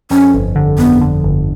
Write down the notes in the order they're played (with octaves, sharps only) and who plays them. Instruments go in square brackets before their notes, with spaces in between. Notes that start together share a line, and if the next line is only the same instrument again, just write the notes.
[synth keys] F2 [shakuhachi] C#4
[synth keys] G1
D3
[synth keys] F2 [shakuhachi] B3
[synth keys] D3
G1